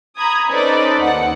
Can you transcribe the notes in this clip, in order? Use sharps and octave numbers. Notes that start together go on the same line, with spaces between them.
A#5 B5 D#6 G#6
C#4 D#4 A4 B4 C5 D5
D#2 F#5